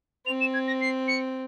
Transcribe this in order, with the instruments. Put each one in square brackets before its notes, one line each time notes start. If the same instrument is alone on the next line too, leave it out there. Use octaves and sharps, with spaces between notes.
[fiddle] C4 [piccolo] F7
[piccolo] E7
G#6
A#6
C7
C#7